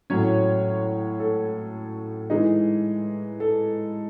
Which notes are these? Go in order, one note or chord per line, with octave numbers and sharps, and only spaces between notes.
A2 F#3 C#4 C#5
A4
E3 G#3 D#4
A4